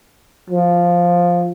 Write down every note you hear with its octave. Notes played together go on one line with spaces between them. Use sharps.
F3